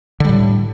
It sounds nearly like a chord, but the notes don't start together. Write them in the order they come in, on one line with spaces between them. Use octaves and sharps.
D3 G3 A2